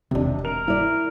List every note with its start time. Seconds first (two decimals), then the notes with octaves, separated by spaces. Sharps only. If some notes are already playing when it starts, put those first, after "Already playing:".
0.11 E1 C3 D#3 D4
0.45 A#4 F7
0.68 E4 D5